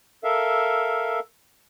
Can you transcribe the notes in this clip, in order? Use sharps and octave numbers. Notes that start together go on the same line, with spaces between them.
A4 A#4 E5 F5